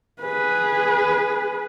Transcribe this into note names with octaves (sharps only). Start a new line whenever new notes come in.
G#4 B4